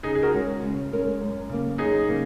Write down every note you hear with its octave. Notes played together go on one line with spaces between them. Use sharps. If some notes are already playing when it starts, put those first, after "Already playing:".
C#3 D#4 G#4
G#4
F#4 A#4
G#3 C#4 A#4
C#3
G#3 C#4 A#4
F#2
C#3 A#3
F#2 D#4 G#4
C#3 A#3